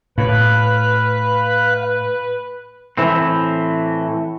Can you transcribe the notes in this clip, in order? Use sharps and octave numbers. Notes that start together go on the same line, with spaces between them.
A2 B4 F5 B5 F#6
A2 E3 C4